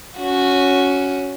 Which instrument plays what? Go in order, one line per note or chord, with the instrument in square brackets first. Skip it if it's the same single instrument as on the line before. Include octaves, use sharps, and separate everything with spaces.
[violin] C#4 F#4